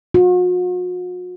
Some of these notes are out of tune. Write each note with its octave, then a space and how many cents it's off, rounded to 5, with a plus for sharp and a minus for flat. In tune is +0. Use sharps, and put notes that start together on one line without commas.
F#4 -45